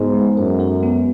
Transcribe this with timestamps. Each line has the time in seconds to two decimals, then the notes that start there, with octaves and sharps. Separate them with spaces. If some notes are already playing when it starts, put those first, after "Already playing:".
Already playing: G#2 B3 F#4
0.14 G#3
0.37 F#2 A4
0.60 F#4
0.83 B3